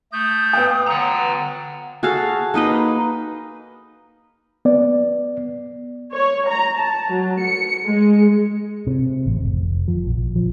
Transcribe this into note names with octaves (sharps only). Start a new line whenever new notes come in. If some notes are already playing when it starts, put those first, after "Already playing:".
A3 D#6 G6
B3 F5 G5
D3 F#5 A#5
F#4 G#4 A4 F5
A#3 D#4 B4 D#5
B3 D5
C#5
A#5
A5
F#3
C#7
G#3
C3
A1
F1
F3
A#1
F3